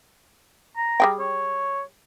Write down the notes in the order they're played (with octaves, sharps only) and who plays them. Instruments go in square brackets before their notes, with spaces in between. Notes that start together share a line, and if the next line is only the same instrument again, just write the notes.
[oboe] A#5
[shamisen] G3 G#4 G5
[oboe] C#5